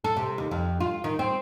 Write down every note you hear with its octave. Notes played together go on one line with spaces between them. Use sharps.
A4
C3
D#2
F2
F4
D#3
C4